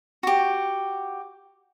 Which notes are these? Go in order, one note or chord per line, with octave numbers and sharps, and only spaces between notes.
F#4 G4